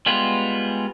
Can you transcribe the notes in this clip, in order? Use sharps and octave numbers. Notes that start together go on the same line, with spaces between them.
G3 G#3 B3 F4